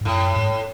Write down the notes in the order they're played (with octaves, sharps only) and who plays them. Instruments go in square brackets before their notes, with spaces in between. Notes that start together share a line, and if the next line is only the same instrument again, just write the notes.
[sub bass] G#2
[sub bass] F#2 [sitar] A2
[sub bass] G#2